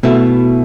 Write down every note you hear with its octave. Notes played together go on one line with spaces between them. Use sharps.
B2 A3 E4